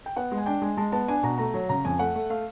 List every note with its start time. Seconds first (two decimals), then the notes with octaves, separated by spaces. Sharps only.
0.06 G5
0.16 B3 F#5
0.32 G#3
0.38 G#5
0.46 D4 G5
0.62 G#3 G#5
0.77 G#3 A5
0.92 B3 A5
1.08 D4 G#5
1.23 B2 A#5
1.38 A3 A#5
1.54 F#3
1.69 C#3 A#5
1.85 F2 G#5
1.99 A3 F#5
2.15 A3
2.30 A3 F5